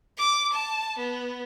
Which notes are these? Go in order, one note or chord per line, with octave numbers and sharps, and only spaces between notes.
D6
A5
B3